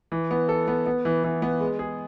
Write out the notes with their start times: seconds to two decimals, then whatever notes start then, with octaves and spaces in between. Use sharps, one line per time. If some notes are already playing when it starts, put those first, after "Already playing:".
0.12 E3
0.31 B3
0.49 A4
0.68 B3
0.86 B3
1.05 E3
1.24 E3
1.42 B3
1.61 G#3
1.79 G#4